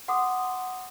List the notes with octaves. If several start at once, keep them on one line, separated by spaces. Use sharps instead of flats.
F#5 C6 D6 D#6